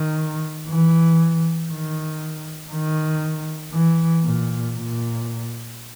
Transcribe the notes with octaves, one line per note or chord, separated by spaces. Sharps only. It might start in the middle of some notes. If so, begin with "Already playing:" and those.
Already playing: D#3
E3
D#3
D#3
E3
A#2
A#2